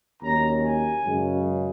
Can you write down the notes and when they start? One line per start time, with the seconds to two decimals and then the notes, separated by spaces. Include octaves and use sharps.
0.22 D#2 D#3 F#3 C#4 A#5
0.64 G#5
1.06 F#2 C#3 G#3